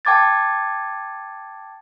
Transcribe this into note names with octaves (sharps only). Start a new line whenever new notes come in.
G5 A5 D6 G#6 A6